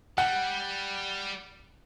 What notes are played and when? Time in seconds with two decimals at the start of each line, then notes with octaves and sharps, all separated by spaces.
0.18 G3 F#5